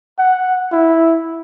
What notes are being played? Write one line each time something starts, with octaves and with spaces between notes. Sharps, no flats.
F#5
E4